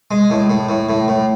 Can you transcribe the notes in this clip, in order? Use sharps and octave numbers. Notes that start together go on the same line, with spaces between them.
G#3
A2
A2
A2
A2
A2